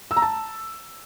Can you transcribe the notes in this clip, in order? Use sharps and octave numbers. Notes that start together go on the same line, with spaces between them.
E6
A#5
A5